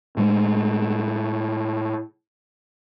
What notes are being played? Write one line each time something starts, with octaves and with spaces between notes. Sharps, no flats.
A2 G#3